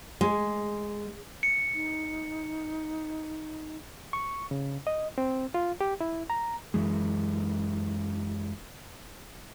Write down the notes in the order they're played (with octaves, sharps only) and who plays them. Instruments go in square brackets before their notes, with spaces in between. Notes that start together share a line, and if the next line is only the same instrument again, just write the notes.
[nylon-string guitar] G#3
[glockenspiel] C#7
[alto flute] D#4
[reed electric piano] C#6
C#3
D#5
C4
F4
G4
E4
A#5
[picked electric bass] F#2 E3 G#3